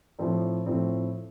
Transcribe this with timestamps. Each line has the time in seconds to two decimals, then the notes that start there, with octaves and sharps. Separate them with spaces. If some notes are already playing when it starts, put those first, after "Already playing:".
0.19 A2 F3 C4
0.66 A2 F3 C4